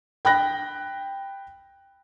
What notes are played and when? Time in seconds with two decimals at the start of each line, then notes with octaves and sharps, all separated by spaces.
0.25 G5 B5 F#6 A#6